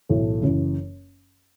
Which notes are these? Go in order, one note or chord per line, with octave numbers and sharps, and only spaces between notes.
B1 A2 E3 A3
F#1 F#2 E3